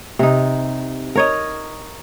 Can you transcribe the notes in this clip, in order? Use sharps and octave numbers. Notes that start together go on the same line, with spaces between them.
C3 D#4
A#4 C#5 D#5